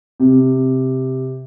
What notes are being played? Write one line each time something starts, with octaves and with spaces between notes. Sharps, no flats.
C3